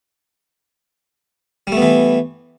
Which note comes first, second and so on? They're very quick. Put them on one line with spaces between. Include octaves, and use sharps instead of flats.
G3 A3 B3 E3